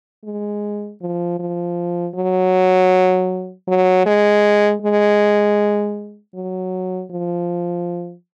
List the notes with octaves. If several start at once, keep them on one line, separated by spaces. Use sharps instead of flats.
G#3
F3
F3
F#3
F#3
G#3
G#3
F#3
F3